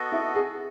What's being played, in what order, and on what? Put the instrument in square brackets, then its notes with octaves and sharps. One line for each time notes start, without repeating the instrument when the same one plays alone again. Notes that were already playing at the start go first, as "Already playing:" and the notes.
Already playing: [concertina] B3 F#4 A4 D#5
[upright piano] E4
G#4